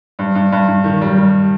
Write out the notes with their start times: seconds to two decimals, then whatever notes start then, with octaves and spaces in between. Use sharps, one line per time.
0.19 G2
0.35 G2
0.52 G2
0.68 G2
0.84 D#3
1.01 G3
1.17 G3